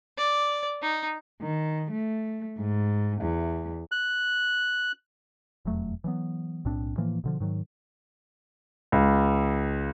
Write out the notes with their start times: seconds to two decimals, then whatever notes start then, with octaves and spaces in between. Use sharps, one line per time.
0.18 D5
0.82 D#4
1.41 D#3
1.91 A3
2.58 G#2
3.22 E2
3.92 F#6
5.65 E1 F2 F#3 A3
6.04 E3 F#3 B3
6.65 B1 A2 C4 D4
6.97 A2 E3 F3 A#3
7.24 B2 D3 F3
7.40 G#2 D#3 F#3
8.92 C#2